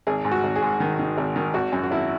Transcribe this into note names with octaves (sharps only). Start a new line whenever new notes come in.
G#1 G#4
G#2
F#4
G#1
G#4
G#2
D#3
D#3
G#1
D#3
G#1 F#4
F#2
F#4
G#1 E4